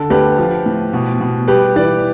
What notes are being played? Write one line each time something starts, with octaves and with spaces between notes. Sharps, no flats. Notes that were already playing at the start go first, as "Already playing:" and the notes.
Already playing: D3 A4
D2 G4 B4
F3
A2
B2
B2
G3 G4 B4
E3 B4 D5